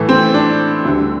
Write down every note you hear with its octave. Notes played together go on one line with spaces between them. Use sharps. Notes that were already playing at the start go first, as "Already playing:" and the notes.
Already playing: A2 E3 A3
C4
D4
D2 D3 G3